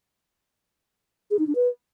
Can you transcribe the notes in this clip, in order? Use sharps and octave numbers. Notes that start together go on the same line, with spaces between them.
G#4
D#4
D4
B4